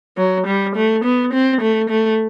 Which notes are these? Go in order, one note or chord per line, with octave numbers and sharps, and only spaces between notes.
F#3
G3
A3
B3
C4
A3
A3